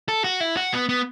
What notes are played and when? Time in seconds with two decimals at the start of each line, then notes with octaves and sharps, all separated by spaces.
0.09 A4
0.24 F#4
0.40 E4
0.57 F#4
0.73 B3
0.89 B3